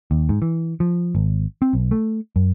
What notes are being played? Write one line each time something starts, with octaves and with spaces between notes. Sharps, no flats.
D#2
G#2
E3
F3
G#1
C4
B1
A3
F#2